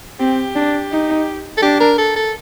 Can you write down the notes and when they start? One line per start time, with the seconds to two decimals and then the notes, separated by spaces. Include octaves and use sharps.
0.19 C4 G4
0.55 D4
0.91 D#4
1.57 A4
1.62 D4 G4
1.80 A#4
1.98 A4
2.16 A4